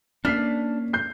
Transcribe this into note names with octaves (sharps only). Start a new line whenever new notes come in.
A#3 C#4 D4 F6 B6 C7
G6 C7